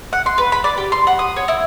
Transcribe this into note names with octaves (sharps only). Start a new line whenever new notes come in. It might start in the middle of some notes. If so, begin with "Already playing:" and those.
F#5
C6
B4
B5
D5
G4
C6
F#5
D#6
C#5
E4